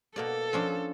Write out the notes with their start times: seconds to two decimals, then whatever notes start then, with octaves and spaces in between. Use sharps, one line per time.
0.16 B2 A#3 A4 D5
0.53 F3 C#4 D4